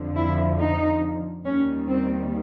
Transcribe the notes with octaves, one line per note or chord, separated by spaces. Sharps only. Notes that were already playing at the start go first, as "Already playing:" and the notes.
Already playing: F2 D3 F3
E4
D#4
D#2 D#3 G3 C#4
C4